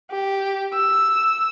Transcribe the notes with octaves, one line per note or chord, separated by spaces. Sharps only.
G4
E6